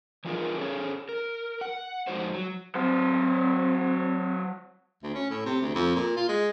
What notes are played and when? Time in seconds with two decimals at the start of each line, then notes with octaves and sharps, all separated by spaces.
0.25 E3 F#3 D#4 F4 G#4 A#4
0.57 C#4 G#4 A4 C#5
1.09 A#4
1.61 F#5
2.07 F2 G#3 D#4 F#4 C5
2.34 F#3
2.75 F#3 C4 C5
5.03 D2
5.14 C#4
5.30 A2
5.45 C3
5.61 D2
5.75 F2
5.95 A#2
6.16 F4
6.28 G#3